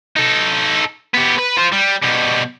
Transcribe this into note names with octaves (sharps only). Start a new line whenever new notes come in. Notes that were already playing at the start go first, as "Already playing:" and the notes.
D#4 A4
B3 G4
B4
F4 C5
G3
B2 G3